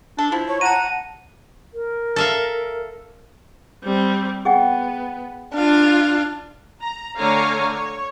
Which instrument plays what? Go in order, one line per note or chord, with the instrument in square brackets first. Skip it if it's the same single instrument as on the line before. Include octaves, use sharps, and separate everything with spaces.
[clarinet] D4 [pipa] A4
[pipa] F3 [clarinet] E4
[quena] C#5
[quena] F#5 [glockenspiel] A5 D#7 [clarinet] A#5
[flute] A#4
[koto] A4 E5 F5
[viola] G3 C4
[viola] B3 [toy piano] G#4 F#5 G5
[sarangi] D4 [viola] F4 F5
[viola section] A#5
D3 A3 C#5 F5 G#5 A#5
C#5